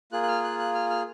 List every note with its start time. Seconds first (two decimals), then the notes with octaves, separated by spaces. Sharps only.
0.12 A#3 F4 G#4 F#6
0.23 F#6
0.28 F6
0.44 F#6
0.59 F#6
0.74 F6
0.90 F6